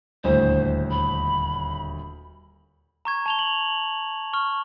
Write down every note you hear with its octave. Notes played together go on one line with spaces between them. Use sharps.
D#1 D2 A2 C5
B5
A#5 C#6 G#6
A5 F7 G7
F#7
C#6 F6